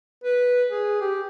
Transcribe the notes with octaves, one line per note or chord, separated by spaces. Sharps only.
B4
G#4
G4